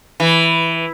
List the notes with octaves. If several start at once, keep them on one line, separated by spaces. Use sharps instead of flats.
E3